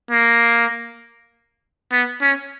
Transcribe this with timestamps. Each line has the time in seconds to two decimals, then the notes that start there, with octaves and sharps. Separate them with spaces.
0.11 A#3
1.92 B3
2.22 C#4